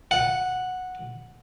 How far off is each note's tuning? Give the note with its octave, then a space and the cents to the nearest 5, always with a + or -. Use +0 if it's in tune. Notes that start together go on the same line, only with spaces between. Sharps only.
F#5 -5